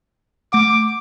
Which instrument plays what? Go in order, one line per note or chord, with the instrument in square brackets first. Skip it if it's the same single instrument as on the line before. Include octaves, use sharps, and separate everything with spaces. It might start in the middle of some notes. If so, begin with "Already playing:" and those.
[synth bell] A3 F#5 [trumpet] D6